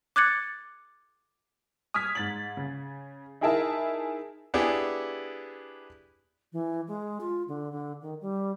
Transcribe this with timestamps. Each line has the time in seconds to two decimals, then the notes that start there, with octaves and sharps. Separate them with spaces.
0.16 D6 F#6 G#6 A6 C#7
1.94 D#6 F6 G#6 B6
2.15 G#2 A6 F#7
2.57 C#3
3.41 D#4 E4 G#4 A#4 E5 A5
4.54 B3 D4 E4 G4 G#4
6.53 E3
6.88 G#3
7.21 F4
7.48 D3
7.72 D3
8.02 D#3
8.21 G3